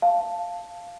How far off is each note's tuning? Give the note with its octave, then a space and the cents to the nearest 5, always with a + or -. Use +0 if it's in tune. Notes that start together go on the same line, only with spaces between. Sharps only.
F5 +0 A5 +0